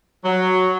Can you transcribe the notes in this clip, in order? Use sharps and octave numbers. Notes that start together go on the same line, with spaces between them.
F#3